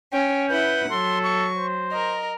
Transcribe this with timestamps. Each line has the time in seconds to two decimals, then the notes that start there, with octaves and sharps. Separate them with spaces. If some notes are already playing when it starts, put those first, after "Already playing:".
0.12 C#4 G5
0.49 E4 B4 F#5 G6
0.90 F#3 A4 C6
1.23 C#6
1.57 C5
1.91 A#4 D#5